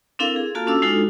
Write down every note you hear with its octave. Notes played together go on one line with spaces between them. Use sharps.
C4 D4 E4 A4 A#4 F5
G#4
A#3 F4 F#4 A4 F5 A5
C#4 D4 F#4 A4 D6 E6
G#3 D4 D#4 F4 F#4 A4